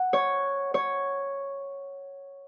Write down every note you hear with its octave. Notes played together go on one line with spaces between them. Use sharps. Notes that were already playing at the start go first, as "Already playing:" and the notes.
Already playing: F#5
C#5
C#5